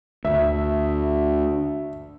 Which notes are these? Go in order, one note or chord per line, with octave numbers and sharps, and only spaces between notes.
D2 E5